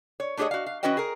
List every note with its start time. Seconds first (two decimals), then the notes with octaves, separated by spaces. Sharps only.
0.20 C#5
0.37 A3 D4 G4 G#4 C#5 D#5
0.51 F#4 F5
0.66 F5
0.83 E3 C#4 F#4 B4 D#5 G5
0.97 G#4 A#4